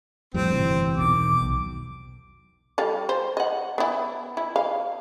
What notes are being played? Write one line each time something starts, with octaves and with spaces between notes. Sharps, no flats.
F2 A2 G3 C4
G1 C3 E3
E2 B2 D#3 D6
B1
G3 A4 F5
C5
D#5 F#5
B3 E4
E4
F5